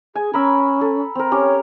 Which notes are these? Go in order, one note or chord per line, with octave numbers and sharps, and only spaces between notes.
G#4 G#5
C#4 A#4 B5 E6
A4
C4 A#4
C#4 G4 C#5